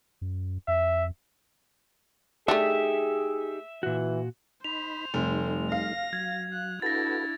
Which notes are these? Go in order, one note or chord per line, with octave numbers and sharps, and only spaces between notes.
F#2
F2 E5
A3 D4 D#4 G4 G#4 E5
A#2 E3 F#4
D#4 C5 B5 F7
F1 G3 A3 D#4
F5 A#6
F#3 G#6
F#6
D4 E4 F#4 A4 B4 A6 A#6